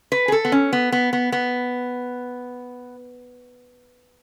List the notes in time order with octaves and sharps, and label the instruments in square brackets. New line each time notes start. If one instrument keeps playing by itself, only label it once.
[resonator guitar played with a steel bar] B4
G#4
A4
B3
C#4
B3
B3
B3
B3